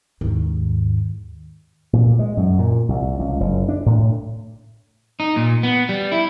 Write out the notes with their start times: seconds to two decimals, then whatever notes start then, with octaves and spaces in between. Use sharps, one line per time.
0.21 D#2 G#2
1.93 A#2
2.19 G#3
2.37 F#2
2.59 A#2
2.89 C2
3.19 C#2
3.40 F#1
3.69 D4
3.86 A2
5.20 D#4
5.36 A#2
5.63 B3
5.89 G3
6.12 E4